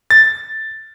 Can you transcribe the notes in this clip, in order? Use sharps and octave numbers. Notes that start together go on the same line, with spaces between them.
A6